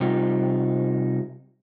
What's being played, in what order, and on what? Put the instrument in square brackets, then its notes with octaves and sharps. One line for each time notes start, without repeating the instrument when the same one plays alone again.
[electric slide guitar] C3 G3 D#4 F4 G4